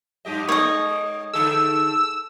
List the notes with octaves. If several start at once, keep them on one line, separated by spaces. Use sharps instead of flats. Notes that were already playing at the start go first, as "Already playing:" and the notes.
G2 G4 D#5
G#3 C#5 D#5
D3 G#4 A4 E6